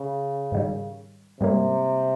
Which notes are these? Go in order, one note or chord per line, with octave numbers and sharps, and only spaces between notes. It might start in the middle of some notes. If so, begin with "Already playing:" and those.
Already playing: C#3
G#2 D#3 G3
G#2 C3 G3 A#3 C#4